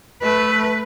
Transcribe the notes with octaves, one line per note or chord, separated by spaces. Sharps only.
A3 B4